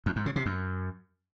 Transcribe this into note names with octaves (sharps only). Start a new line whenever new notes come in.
F2
G#2
C#3
C3
F#2